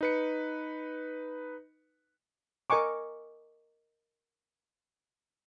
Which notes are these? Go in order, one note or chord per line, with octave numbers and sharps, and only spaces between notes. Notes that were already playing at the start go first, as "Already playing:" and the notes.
D#4 B4 C#7
A#4 D#5 G#5 C#6 D6